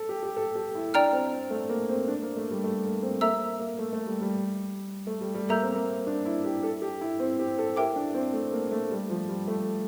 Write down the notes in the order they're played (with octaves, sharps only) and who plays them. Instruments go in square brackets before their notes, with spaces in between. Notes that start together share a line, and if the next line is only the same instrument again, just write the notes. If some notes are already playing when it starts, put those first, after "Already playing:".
Already playing: [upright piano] A4
G4
G4
A4
G4
E4
[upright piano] D4 [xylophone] D5 G5 A#5 F6
[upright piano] C4
A3
A#3
C4
D4
A#3
A3
G3
A3
A#3
C4
[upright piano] A#3 [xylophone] A4 E5 A#5 E6
[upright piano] A#3
A3
A3
G3
G3
A3
G3
G3
[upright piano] A#3 [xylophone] A4 E5 A#5 E6 G6
[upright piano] C4
A#3
D4
E4
G4
A4
G4
E4
C4
G4
A4
[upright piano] E4 [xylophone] G4 A#4 E5 G5 D6
[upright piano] D4
C4
A3
A#3
A3
G3
F3
G3
A3